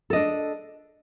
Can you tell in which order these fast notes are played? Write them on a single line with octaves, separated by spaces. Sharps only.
A4 D#5 D4